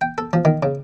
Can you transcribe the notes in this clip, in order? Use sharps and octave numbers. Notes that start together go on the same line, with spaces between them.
G5
A4
F3
D#3
C#3